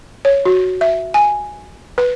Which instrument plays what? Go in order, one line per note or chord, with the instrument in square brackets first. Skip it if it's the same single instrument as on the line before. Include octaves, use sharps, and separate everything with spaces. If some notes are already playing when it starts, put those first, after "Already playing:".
[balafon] C#5
F#4
E5
G#5
B4